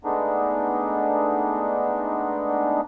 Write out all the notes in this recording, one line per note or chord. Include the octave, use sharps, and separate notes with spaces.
G#3 A3 B3 D4 D#4